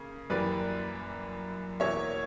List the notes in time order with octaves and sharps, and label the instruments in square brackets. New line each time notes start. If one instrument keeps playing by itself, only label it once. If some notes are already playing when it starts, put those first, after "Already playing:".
Already playing: [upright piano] C#3 A#3
F#2 E3 G3 A#3 B4 D5
E2 B2 A#3 C#5 E5